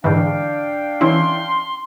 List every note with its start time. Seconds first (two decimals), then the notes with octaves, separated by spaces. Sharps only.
0.04 G#2 D3 E3 D4 F5 G5
1.01 E3 C#4 E4 C6